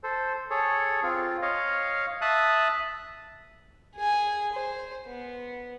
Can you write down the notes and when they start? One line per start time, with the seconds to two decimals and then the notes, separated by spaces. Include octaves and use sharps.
0.03 A4 C5
0.50 G#4 A4 C#5
1.03 C4 F4
1.42 C#5 D#5 F5
2.21 E5 A5 D#6 F#6
3.95 G#4 G#5
4.52 C5
5.07 B3